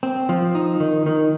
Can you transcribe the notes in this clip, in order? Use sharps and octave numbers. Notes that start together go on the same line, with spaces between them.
C4
F3
D#4
D#3
D#3